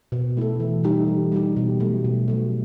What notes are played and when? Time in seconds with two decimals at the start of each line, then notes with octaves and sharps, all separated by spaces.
0.12 B2
0.37 A3 E4 A4
0.60 E3
0.84 G3 D#4 G4
1.08 E3
1.32 G3 D#4 G4
1.57 B2
1.80 F#3 A3
2.04 B2
2.28 F#3 A3